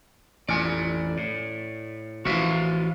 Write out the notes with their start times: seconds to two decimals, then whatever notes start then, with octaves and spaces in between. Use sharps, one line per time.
0.48 A1 F2 D5 G#5
1.17 A2
2.25 A1 E3 F3 F#4 E5 F5